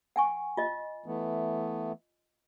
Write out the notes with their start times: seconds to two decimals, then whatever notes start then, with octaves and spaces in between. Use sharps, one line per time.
0.16 F#5 G#5 C#6
0.57 F4 D#5
1.06 E3 A3 B3